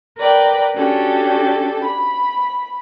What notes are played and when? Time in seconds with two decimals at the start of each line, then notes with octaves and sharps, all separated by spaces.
0.17 A#4 B4 D5 G5
0.76 C#4 D4 F#4 G4 A4
1.83 B5